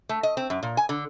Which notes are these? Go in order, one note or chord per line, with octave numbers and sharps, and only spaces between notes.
A3
D#5
C4
F#2
A#2
G#5
D3